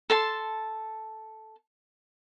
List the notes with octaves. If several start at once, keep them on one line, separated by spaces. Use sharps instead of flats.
A4 A5 C6